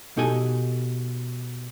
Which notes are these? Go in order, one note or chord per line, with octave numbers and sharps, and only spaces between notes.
B2 D#4 G4 A4 G#5